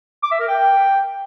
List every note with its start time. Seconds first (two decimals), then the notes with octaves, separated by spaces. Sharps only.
0.23 D6
0.32 E5
0.40 A#4
0.48 G5